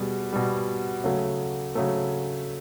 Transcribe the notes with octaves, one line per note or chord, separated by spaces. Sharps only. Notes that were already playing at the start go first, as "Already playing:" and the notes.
Already playing: B2 G3 G#4
B2 G3
C#3 F#3 A3
C#3 F#3 A3